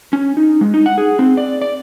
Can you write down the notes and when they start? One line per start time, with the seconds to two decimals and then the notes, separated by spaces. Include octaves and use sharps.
0.13 C#4
0.37 D#4
0.61 G#3
0.74 D#4
0.86 F#5
0.98 G#4
1.19 C4
1.37 D5
1.62 D5